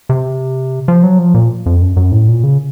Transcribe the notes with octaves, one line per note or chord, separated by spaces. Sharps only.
C3
F3
F#3
F3
A#2
F2
F#2
F#2
A2
A#2
C#3